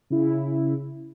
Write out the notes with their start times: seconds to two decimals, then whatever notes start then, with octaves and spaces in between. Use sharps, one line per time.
0.10 C#3 E4